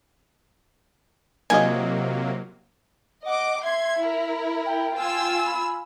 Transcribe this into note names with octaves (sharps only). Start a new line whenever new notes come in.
C3 D#3 F#3 A#3 F4 D#5 G#5
D#5 F#5 D6
E5 C6 G#6
E4 A#4
G5
F4 G#5 E6
B5